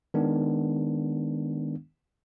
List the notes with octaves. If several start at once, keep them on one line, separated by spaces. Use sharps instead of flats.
D#3 G#3 B3 D4